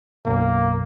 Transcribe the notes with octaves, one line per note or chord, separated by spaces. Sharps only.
B1 F#2 B2 A#3